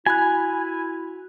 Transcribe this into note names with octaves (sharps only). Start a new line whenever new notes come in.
E4 F#4 G#5 B5 F#6